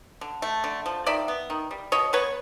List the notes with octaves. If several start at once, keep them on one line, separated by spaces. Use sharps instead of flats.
D3
A3
D3
F3
D#3 D5 E5
B3
D#3
G3
B2 C#5 D#5
B3 B4 C#5